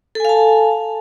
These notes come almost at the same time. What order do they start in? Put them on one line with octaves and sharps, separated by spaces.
A4 G#5 F5 A5